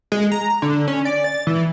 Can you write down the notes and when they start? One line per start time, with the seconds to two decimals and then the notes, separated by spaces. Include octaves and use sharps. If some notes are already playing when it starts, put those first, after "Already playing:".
0.12 G#3
0.32 A#5
0.62 D3
0.88 C#4
1.05 D5
1.24 A6
1.47 E3